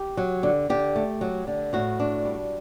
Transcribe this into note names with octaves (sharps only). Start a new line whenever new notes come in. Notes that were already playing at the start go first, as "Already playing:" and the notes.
Already playing: G4
F#3
D3
D3 G4
A3
F#3
D3
A2 F#4
D4
G3